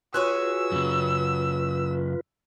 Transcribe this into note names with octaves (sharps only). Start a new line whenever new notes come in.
C#4 F4 F#4 G#4 B4 E6
F#2 C#3